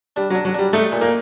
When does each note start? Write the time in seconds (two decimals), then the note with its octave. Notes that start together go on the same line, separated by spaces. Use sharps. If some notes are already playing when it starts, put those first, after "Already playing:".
0.16 G3 D4
0.30 F#3
0.35 D4
0.45 F#3
0.54 G3 D4
0.73 A3 D#4
0.92 A#2
1.01 A#3